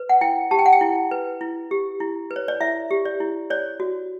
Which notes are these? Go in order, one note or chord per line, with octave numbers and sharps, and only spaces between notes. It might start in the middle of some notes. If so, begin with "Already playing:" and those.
Already playing: B4
F#5
E4 G5
G4 A5
G5
F#5
G5
E4
B4
E4
G4
E4
B4
C#5
D5
E4 E5
G4
D5
E4
C#5 D5
F#4